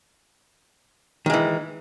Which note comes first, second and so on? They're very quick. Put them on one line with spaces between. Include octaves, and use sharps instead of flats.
D#3 G#3 E3